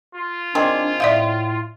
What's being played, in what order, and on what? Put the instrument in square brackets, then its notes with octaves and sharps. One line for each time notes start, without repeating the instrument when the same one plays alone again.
[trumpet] F4
[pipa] D#3 C4 G#4 [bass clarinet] D4
[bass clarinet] A2 [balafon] D5 E5 F5